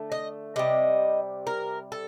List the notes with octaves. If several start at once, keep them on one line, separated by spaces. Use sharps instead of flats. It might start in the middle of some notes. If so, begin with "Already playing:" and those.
Already playing: D3 A3
D#5
C3 G3 D#5
A#4
A4